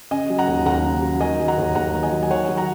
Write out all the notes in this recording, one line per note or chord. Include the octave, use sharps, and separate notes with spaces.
C#3 D#5 G#5
F#3
F#5 A#5
D#2
D#2 F#5 A#5
C#3
F#3
D#3 D#5 G#5
F#3
F#5 A#5
D#2
D#2 F#5 A#5
D#3
D#5 G#5
F#3
G#5
D#3 C#5 F#5
F#3
F#5 A#5